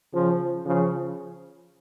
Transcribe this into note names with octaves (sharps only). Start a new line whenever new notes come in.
C#3 F3
C#3 F3